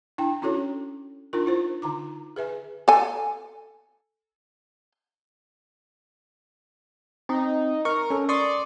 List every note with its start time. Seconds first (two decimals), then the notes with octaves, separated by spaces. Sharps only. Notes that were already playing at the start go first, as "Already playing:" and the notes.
0.18 D4 E4 G5 A5
0.42 C#4 E4 F#4 A4 C#5
1.33 D4 D#4 F4 A#4
1.46 E4 F4 C5
1.82 D3 D#4 A#5 D6
2.36 G#4 B4 E5 G#5
2.88 A4 G#5
7.29 C4 D#4
7.85 A#4 C#6
8.10 C#4 A4
8.29 D5 C6 C#6 D#6